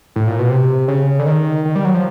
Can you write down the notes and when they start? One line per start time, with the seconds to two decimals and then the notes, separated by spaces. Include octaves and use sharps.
0.16 A2
0.27 A#2
0.39 B2
0.50 C3
0.88 C#3
1.19 D3
1.26 D#3
1.65 D#3
1.76 G3
1.85 F#3
1.94 F3